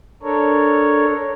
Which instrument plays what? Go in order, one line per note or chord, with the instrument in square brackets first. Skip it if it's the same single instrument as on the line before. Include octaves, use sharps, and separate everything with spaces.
[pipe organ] D4 A4 A#4 C#5